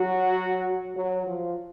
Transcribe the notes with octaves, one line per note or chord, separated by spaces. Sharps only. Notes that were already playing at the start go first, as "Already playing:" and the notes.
Already playing: F#3 F#4
F#3 F#4
F3 F4